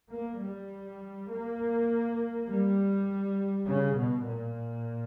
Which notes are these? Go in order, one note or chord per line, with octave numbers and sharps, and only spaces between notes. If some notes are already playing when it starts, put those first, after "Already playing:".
A#3
G3
A#3
G3
C#3
B2
A#2